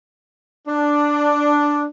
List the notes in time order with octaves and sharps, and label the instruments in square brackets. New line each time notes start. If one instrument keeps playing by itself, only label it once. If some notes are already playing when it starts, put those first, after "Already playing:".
[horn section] D4